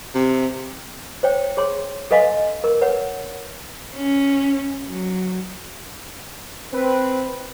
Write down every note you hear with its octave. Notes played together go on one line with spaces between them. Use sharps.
C3
C5 C#5 G5
G#4 C#5 C6
A4 B4 D#5 F5 G#5 C6
A#4
B4 C#5 F#5
C#4
F#3
C4 B4